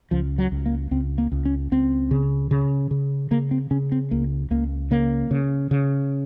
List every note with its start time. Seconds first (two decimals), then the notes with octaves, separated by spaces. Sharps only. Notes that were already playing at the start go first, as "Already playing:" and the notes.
0.11 C#2 F3
0.38 F#3
0.52 C#2
0.66 A#3
0.91 C#2 C4
1.18 A#3
1.32 C#2
1.45 C#4
1.72 C#2 C4
2.11 C#3
2.51 C#3
2.91 C#3
3.31 C#3 A#3
3.51 C4
3.71 C#3 C#4
3.92 C4
4.11 C#2 A#3
4.50 C#2 A#3
4.91 C#3 A#3
5.31 C#3
5.71 C#3